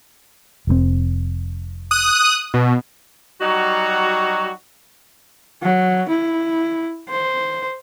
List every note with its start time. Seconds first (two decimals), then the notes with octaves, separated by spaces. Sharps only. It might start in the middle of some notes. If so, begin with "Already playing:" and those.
0.67 F1 G#2 C4
1.91 D#6 F#6
2.54 B2
3.41 F#3 G3 D#4 F#4
5.62 F#3
6.09 E4
7.09 C5